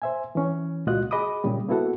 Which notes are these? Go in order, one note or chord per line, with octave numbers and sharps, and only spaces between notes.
C5 E5 G#5
E3 C#4
C#2 A#2 F4 F#4 D#5 F#6
G#4 D#5 B5 D6 D#6
A#2 C#3 G3
A#3 B3 E4 F#4 A4 F#5